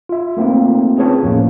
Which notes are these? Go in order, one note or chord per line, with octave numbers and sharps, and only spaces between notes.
F4 E5
A3 A#3 C4 D#4 F4
C4 C#4 G#4 B4 C#5 A5
E2 A2 F3 A#3 C#4